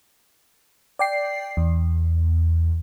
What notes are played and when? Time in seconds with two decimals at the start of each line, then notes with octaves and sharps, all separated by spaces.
0.99 D5 G5 C7
1.57 E2